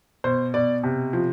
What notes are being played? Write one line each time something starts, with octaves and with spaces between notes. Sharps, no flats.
B2 C5
B2 D5
C3
F3